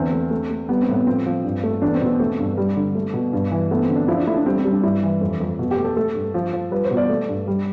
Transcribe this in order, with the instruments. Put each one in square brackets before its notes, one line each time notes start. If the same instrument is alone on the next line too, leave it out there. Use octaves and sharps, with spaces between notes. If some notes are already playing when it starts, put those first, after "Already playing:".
Already playing: [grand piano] E2 D3 C4
A3
A3
A3
G3 B3
C4
A2
B3
F3 C4
F3
G2
A3
E2 D4
C4
B2
C4
A3 C4
G2
G3
D3
A3
B2
G2
E3
A3 B3
C4
D3
D4
F3 E4
D4
A3 E4
D4
G3 C4
C4
G3
D4
G2 E4
E3
F2
F2
B2
G4
A3
A4
A3 A4
G2
F3
F3
G3 B4
C5
B2
D5
A3
G2
G3